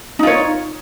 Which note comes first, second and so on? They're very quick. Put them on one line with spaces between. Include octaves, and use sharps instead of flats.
D#4 F4 C#5